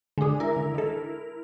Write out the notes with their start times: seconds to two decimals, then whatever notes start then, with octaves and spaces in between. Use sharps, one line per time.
0.18 D3 G#3 D4 G#4
0.40 E4 A#4
0.56 D3
0.74 D#3 A4